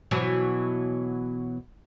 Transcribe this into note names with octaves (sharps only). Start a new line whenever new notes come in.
B2 E3 F#3